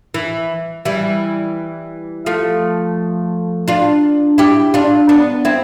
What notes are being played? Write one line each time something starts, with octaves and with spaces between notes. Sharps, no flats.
E3
E3 G3
F3 A3
D4 F4
E4 G4
D4 F4
B3 D4
C4 E4